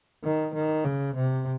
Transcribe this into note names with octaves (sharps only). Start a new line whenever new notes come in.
D#3
D#3
C#3
C3